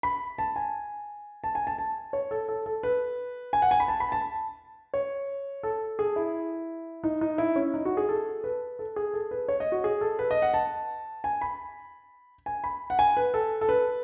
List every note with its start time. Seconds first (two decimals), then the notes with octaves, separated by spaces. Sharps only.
0.03 B5
0.39 A5
0.56 G#5
1.44 A5
1.55 G#5
1.67 A5
1.78 A5
2.13 C#5
2.31 A4
2.48 A4
2.66 A4
2.83 B4
3.53 G#5
3.62 F#5
3.71 G#5
3.80 B5
3.88 A5
4.00 B5
4.12 A5
4.94 C#5
5.63 A4
5.99 G#4
6.16 E4
7.04 D#4
7.21 D#4
7.38 E4
7.56 C#4
7.74 D#4
7.85 F#4
7.97 G#4
8.09 A4
8.44 B4
8.79 A4
8.96 G#4
9.14 A4
9.31 B4
9.48 C#5
9.60 D#5
9.72 F#4
9.84 G#4
10.01 A4
10.19 B4
10.31 D#5
10.42 F#5
10.54 A5
11.24 G#5
11.41 B5
12.46 G#5
12.64 B5
12.90 F#5
12.99 G#5
13.17 B4
13.34 A4
13.61 A4
13.69 B4